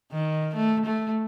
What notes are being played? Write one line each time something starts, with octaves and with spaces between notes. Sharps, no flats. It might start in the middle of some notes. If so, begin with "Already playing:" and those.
D#3
A3
A3